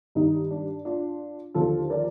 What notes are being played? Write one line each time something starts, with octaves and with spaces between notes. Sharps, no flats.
G2 D#3 D#4
D4
D4 F4
D#2 D3 F3 F4 A4
A#4 D5